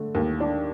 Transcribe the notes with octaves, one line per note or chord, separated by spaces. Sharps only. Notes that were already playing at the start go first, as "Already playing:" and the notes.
Already playing: D3 A3
D#2
D4